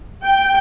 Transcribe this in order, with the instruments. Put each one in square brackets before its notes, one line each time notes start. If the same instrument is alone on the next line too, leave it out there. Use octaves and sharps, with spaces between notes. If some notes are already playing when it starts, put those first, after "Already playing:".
[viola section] G5